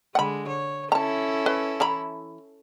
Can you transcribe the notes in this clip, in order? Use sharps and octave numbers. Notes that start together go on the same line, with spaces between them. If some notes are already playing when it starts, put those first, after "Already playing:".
D3 G#3 F#5 B5
C#5
C#4 E4 A4 A5 A#5
B4
E3 A#5 B5